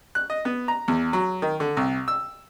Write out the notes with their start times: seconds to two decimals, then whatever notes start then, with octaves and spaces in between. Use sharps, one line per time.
0.15 F#6
0.30 D#5
0.45 B3
0.68 A#5
0.88 E2
1.13 F#3
1.42 D#3
1.60 D3
1.77 C2
2.08 E6